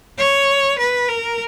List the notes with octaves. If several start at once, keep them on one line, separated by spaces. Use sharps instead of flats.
C#5
B4
A#4